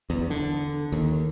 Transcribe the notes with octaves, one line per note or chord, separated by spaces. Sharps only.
E2
D3
D#2